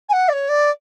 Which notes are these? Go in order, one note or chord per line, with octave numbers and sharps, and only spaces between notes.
G#5
F#5
D5
C#5
D5